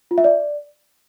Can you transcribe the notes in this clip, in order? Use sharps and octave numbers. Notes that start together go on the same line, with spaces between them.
F4
E5
D5